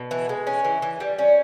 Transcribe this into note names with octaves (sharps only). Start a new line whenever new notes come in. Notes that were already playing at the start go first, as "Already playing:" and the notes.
Already playing: B2
E3
G#3
C#4
E3
E3
G3
C#4